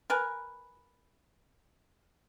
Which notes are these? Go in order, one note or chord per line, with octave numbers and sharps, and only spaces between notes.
A#4 B4 G#5